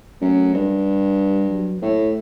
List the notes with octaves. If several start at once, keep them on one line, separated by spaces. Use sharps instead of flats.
F#2 A3
G2 G3
F#3
A2 A3